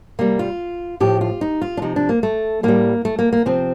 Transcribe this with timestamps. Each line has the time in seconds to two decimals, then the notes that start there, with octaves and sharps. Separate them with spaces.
0.19 C3 G3 A#3
0.39 F4
1.00 A2 F3 G4
1.21 F4
1.41 D#4
1.61 F4
1.77 D4
1.82 C3 F3 D#4
1.96 D4
2.09 A#3
2.23 A3
2.63 A2 G3 A#3
3.05 A3
3.19 A#3
3.33 A#3
3.46 C3 F3 C4